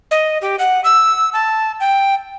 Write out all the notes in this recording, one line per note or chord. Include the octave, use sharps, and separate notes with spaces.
D#5
G4
F#5
E6
A5
G5